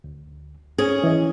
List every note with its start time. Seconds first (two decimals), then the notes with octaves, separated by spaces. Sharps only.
0.04 D2
0.78 C#4 G#4 G#5
1.04 E3 D#5